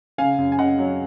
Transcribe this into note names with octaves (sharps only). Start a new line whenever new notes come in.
C#3 F5 G#5
F#2
G#5
C#3 D#5 F#5
F#3